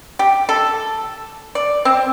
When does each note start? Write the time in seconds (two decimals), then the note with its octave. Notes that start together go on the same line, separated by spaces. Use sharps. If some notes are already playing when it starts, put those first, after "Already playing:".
0.19 G4
0.49 A4
1.55 D5
1.85 C4